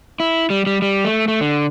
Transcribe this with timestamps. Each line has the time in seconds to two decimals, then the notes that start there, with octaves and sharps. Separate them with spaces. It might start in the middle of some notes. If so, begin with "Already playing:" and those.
0.20 E4
0.50 G3
0.67 G3
0.82 G3
1.05 A3
1.28 A3
1.41 D3